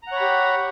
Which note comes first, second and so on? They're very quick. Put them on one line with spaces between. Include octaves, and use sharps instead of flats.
A#5 F#5 C#5 B5 G4